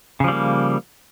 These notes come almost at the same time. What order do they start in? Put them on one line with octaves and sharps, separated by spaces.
C#3 F3 G3 A#3